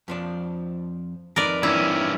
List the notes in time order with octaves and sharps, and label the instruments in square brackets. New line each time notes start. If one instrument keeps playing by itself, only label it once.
[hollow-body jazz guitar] F2 F3 D4
[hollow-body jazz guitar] F2 D4 D#4 [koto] A#4 B4 D5
[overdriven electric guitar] G2 C#4 [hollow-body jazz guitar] E3 C4 D#4 [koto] E4